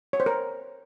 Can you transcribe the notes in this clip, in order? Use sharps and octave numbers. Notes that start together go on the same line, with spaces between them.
C#5
C5
A#4